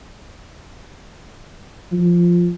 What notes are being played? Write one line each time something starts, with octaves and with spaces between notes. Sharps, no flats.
F3